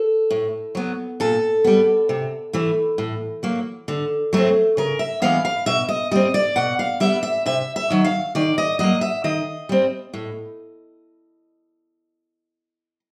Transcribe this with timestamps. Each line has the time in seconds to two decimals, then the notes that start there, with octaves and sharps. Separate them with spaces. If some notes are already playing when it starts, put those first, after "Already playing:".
Already playing: A4
0.30 A2
0.75 F#3 B3
1.20 A#2 A4
1.64 G3 B3
2.09 C3
2.53 E3 A3
2.98 A2
3.43 F#3 A#3
3.88 D3
4.33 F#3 A3 C4
4.77 C#3 A#4
4.99 E5
5.22 E3 G#3 B3 F5
5.45 F5
5.66 B2 E5
5.89 D#5
6.11 G3 C4 D#5
6.34 D5
6.56 B2 F#5
6.79 F5
7.00 G3 B3 E5
7.23 E5
7.46 C3 E5
7.76 E5
7.90 D#3 F#3
8.04 F5
8.35 D#3 D5
8.58 D#5
8.79 F#3 A#3 D#5
9.01 E5
9.24 D#3 D#5
9.69 G3 C4
10.14 A2